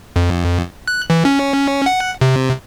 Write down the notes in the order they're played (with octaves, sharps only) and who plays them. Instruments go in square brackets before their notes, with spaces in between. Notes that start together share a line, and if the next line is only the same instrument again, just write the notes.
[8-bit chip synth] F2
F#6
E3
C#4
F#5
C3